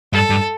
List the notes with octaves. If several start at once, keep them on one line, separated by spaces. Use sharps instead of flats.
G2 A4
G2